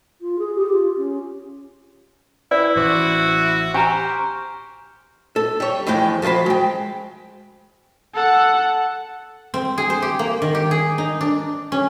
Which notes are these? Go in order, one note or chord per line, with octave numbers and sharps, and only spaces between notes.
F4
G#4
G4
F4
C#4
E4 B4 D5
A1 F#4 C5 D6
G4 C5 G#5 A#5 C#6 F6
A4
G3 C#5
E2 A2 F3 G#3 G5
F3 F#3 F4 C5 B5
G#3 G5
A4 F#5
C4
G#4
C5
G4
A#3
D#3
G4
G#4
D#4
D4
C#4